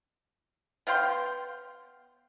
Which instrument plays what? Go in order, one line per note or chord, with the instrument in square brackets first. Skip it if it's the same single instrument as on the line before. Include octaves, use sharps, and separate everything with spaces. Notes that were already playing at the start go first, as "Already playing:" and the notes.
[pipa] B3 F5 G5 C6